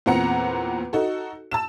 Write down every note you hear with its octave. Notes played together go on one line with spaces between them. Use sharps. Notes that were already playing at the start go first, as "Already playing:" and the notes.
E2 A#2 C4 F#5 A#5 C#7
D#4 F#4 A4
A5 E6 E7